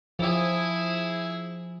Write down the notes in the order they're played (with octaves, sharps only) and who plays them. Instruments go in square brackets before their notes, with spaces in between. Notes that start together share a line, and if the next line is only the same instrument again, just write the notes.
[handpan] F3 [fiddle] E4 G#4